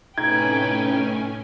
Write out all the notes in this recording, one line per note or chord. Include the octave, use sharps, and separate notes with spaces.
A2 C3 C#4 D#4 B4 G5 G#5 G#6